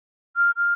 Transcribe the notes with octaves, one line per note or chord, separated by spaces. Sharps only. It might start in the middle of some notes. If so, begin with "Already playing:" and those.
F6
F6